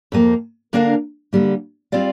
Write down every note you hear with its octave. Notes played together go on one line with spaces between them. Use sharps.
F2 F3 A#3
D3 A#3 D4 A#4 F5
D3 G3 A#3
G3 C4 F4 D5 F5